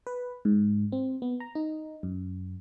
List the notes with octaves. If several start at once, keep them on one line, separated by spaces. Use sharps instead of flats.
B4
G#2
C4
B3
A#5
D#4
F#2